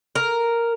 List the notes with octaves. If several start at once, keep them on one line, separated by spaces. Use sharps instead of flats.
A#4